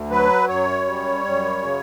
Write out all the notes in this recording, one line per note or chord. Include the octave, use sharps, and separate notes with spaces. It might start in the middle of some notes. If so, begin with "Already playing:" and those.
Already playing: D2
F#3 B4
F#2 C#5
G3
F#2
C#3